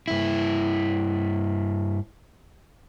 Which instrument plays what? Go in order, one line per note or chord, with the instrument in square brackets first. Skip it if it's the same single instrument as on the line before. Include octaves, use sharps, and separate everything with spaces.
[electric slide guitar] G2 E4